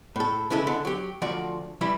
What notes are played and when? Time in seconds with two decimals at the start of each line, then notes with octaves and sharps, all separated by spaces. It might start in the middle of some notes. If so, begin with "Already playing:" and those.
0.16 A2 A4
0.50 C#3 E3 G#3 E4 A4
0.67 D3
0.85 F#3 G4
1.22 D2 F3 F#4 D5
1.81 E3 G3 E4